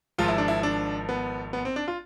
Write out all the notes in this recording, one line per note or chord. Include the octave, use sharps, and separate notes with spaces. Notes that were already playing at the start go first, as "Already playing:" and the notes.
G#1 G#2 F3 F4
E4
D4
E4
D4
B3
B3
C4
D4
F4